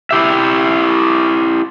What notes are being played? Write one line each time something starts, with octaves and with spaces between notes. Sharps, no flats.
E4 G4 E5